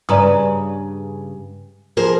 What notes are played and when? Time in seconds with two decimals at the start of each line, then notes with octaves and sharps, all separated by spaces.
0.09 G2 C#3 B4 D5 A#5 D#6
1.97 F3 G#4 A#4 C5